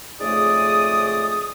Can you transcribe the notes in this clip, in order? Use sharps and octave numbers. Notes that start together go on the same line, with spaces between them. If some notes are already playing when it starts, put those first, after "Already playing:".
F2 G#2 C#3 A3 D5 D#6